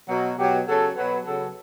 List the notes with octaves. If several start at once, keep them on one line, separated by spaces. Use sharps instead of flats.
B2 F#3
B2 F#3 G4
C#3 F#3 A4
B2 F#3 B4
C#3 F#3 A4